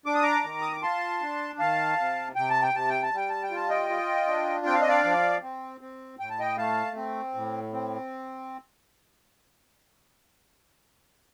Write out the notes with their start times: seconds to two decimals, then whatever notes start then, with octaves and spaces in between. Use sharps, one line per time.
0.06 D4 D6
0.14 D#6
0.23 A#5 D6
0.44 D#3
0.61 D#6
0.72 D6
0.82 F4 A5 C6
1.21 D4
1.59 D#3 F5 A5
1.98 C3
2.36 C3 G5
2.50 A5
2.62 G5
2.74 C3 A5
2.89 G5
3.03 A5
3.12 G3 G5
3.30 A5
3.43 G5
3.51 F4 A5
3.69 D#5 G5
3.90 F4
4.28 D4
4.66 C4 G5
4.73 F5
4.81 D#5
4.88 D5 F5
5.04 F3
5.42 C4
5.81 C4
6.19 A2 G5
6.30 A5
6.40 D#5 G5
6.57 A3 F5 A5
6.96 C4
7.34 A2
7.73 C4